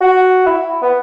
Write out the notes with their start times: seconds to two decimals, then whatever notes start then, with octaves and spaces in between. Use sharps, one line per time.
0.01 F#4
0.46 E4
0.82 B3